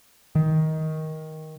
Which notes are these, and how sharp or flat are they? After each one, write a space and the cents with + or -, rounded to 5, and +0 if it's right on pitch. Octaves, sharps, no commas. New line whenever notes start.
D#3 +15